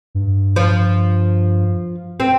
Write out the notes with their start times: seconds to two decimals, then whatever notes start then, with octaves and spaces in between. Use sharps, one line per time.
0.15 G2
0.56 F3
2.20 C4